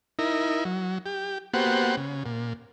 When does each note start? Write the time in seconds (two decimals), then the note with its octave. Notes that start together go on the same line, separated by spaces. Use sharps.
0.19 D#4 E4 A#4
0.65 F#3
1.06 G4
1.54 A#3 B3 F#4 G4 C5 F#5
1.97 C#3
2.26 A#2